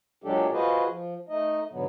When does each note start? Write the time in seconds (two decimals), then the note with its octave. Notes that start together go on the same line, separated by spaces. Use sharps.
0.24 A#2 F#3 G#3 D4 G4 A4
0.53 F4 F#4 G#4 B4 C5 D#5
0.88 F3
1.29 A3 D#4 D#5
1.71 G#2 B2 D3 F#3 B3